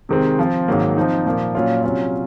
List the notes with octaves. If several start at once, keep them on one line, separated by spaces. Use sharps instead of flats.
C3 D#3 G#3 C4
F3 C4 F4
G#2 D#3 F#3 A#3
F3 C4 D#4
A#2 F3 A#3
A#2 F#3 C#4 F4
C3 F#3 C#4 F4